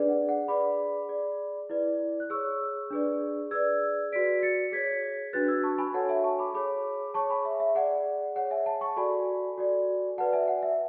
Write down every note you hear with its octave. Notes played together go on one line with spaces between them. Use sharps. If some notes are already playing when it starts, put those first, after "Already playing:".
Already playing: D4 G#4 B4 D5
F#5
F#5
G#4 B4 D5 B5 D6
G#4 D5
E4 B4 D5
F#6
G#4 C#5 C#6 E6
D4 G#4 B4 D5
G#4 B4 D5 E6 G#6
F#4 B4 D5 B6 D7
A6 C#7
G#4 C#5 G#6 B6
D4 F#4 B4 F#6 A6
E6 G#6
A5 C#6
G#5 B5
F#4 A4 C#5 F#5 A5
E5 G#5
A5 C#6
B5 D6
G#4 C#5 B5 D6
G#4 C#5 A5 C#6
G#5 B5
E5
E5
G#4 D5 F#5
G#4 C#5 F#5
E5 G#5
F#5 A5
A5 C#6
F#4 A4 D5 G#5 B5
F#4 A4 D5
F#4 B4 D5 F#5 A5
E5 G#5
F#5
E5